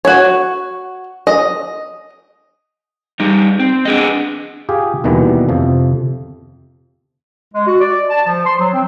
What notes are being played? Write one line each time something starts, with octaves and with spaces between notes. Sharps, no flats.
F#4 C#5
D#5
G3 D#4
C4
D4 G#4 D#5
F4 G4 G#4
D#2 B2 D#3 E3 G3
F2 C3 F3
G#3
F#4
D5
A5
F3
C6
F#3
C4